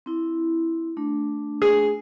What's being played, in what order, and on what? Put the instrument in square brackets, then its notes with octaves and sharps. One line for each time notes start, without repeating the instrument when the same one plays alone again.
[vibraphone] C4 E4
A3 D4
[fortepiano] G#4